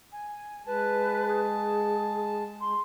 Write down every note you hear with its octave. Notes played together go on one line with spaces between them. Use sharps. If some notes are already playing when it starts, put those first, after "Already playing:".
G#5
G#3 B4 A5
G#4
G#3 C6